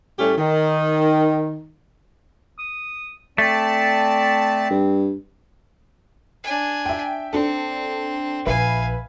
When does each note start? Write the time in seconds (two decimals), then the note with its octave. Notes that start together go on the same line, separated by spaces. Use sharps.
0.18 A2 G3 A3 C#4 G4
0.37 D#3
2.59 D#6
3.38 A3 C4 D5 A5
4.70 G2
6.44 D4 G#5
6.86 E5 G5
7.33 C4 D4 A4
8.46 A#1 B4 E5 F5 G#5